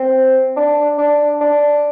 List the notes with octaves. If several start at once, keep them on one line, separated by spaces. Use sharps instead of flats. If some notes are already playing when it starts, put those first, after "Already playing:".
Already playing: C4
D4
D4
D4